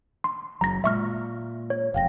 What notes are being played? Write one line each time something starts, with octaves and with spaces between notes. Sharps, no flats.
C6
F#1 F#3 A#5 A#6
A#2 G#3 E5 C#6 F6
C#5
E1 F2 F5 G5 A#6